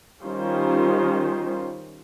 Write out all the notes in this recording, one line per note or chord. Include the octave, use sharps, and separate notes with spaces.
D#3 G3 C#4 F4 C5